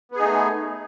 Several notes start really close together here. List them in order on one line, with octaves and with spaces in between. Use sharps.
B3 G#4 D#4 A3